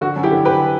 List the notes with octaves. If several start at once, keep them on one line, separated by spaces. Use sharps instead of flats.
D3 F#4
F#2
E4 G4
D3
D3 G4 B4